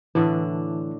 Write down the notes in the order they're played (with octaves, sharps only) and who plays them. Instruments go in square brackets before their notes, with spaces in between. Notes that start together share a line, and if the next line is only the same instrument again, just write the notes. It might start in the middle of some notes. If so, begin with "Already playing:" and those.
[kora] A2 D3 D4 [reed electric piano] E3